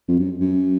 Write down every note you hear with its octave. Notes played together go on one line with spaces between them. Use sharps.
F2
F#2
F#2